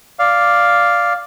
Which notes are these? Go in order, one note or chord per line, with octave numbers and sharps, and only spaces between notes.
D5 F5